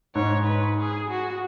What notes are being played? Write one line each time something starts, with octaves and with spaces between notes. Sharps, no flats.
G#2 C#5
B4
G#4
F#4